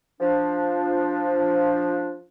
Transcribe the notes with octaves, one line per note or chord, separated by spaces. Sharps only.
F3 D4